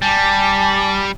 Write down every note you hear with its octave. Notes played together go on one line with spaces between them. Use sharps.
G3 G#5 A5 D6